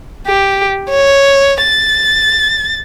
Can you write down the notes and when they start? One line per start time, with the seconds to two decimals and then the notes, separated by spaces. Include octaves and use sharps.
0.27 G4
0.90 C#5
1.63 A6